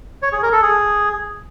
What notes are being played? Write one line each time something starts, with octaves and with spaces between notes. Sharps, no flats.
C#5
G#4
A#4
A4
G#4